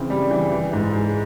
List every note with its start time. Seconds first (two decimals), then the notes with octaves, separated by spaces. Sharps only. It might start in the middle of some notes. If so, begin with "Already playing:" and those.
Already playing: C#3 E3 C4
0.10 G3
0.31 E3
0.52 E3
0.73 G#2
0.93 G#3